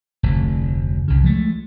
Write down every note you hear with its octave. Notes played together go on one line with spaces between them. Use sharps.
F1 D2
C2 C#3
F3 G#3 A3